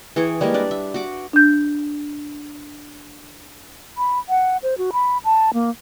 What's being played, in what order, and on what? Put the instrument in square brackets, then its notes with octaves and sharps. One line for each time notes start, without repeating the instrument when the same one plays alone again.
[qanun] E3 G#4 G5 C#6
G3 G#3 A#3 A#4
D4 B4 D5
E5
F#4 F#5 D6
[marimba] D4 G6
[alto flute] B5
F#5
C5
F#4
B5
A5
A#3